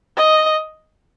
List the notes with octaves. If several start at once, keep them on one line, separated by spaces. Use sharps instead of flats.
D#5